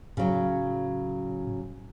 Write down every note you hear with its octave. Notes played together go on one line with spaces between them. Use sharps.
A2 C#3 F#3